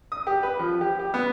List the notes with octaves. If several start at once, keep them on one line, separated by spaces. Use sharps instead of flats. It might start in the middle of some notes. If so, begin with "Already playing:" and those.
D#6
G4
B4
F3
G4
G4
B3